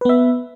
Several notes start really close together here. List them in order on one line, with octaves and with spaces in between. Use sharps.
B4 B3 E5